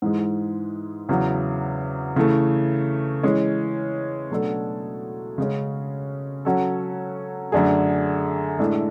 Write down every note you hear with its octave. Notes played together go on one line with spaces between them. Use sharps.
G#2 E3 G#3
E2 C#3 F#3
C#3 E3 A3
E3 G#3 C#4
B2 F#3 A3 D4 A4
C#3 G#3 C#4
F#3 C#4 F#4 A4
F#2 D3 A3 D4 G#4
A2 G#3 D4 A4